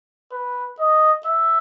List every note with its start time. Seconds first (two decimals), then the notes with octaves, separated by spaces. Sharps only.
0.31 B4
0.79 D#5
1.25 E5